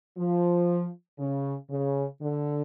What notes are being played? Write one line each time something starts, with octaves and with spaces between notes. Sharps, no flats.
F3
C#3
C#3
D3